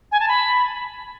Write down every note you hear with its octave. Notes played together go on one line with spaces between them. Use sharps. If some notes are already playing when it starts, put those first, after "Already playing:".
G#5
A5
B5